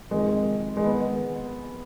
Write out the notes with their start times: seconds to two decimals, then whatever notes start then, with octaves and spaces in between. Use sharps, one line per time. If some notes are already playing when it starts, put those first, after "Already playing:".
0.11 F2 C3 D#3 G#3
0.77 G#3
0.84 D#3 B3